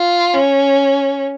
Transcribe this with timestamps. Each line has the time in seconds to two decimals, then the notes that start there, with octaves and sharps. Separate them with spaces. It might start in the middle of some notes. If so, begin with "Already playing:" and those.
Already playing: F4
0.34 C#4